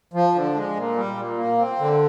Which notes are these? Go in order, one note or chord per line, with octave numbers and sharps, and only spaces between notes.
F3
D3
G#3
A#2
G3
A#2
A#3
C4
D3